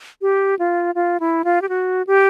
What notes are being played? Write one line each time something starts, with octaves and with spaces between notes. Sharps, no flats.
G4
F4
F4
E4
F4
G4
F#4
G4